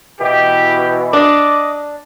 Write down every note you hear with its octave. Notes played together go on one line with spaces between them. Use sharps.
B2 E3 G4
D4 D#5 D6